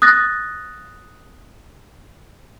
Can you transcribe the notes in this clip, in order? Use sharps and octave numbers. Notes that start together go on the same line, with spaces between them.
D#6 F#6 A6 A#6